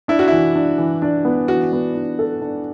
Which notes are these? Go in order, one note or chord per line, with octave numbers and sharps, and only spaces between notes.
D4 E4
F#4
E3 E4
D4
E3
D4
B3
E3 F#4
B3
D4
A4
D4